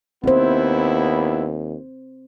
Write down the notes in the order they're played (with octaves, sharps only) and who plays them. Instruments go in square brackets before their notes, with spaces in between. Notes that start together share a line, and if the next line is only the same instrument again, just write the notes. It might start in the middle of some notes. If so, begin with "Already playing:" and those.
[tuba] D#2 [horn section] B3 E4 [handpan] C4 C5